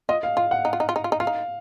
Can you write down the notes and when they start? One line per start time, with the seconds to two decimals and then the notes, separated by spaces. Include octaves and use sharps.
0.09 F4 D#5
0.23 F5
0.37 F4 F5
0.51 F#5
0.65 D#4
0.73 F4
0.80 D#4
0.89 F4
0.96 D#4
1.04 F4
1.12 D#4
1.20 F4 F5
1.27 D#4